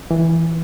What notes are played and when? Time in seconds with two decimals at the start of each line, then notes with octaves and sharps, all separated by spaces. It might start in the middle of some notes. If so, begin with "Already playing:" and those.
0.11 E3